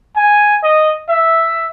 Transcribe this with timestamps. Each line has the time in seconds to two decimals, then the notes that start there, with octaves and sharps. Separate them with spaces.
0.16 G#5
0.63 D#5
1.09 E5